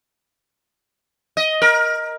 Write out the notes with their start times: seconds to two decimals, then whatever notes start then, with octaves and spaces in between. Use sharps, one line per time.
1.37 D#5
1.62 A#4